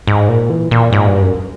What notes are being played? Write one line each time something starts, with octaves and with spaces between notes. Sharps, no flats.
G#2
A#2
E3
A#2
G#2
G2
F#2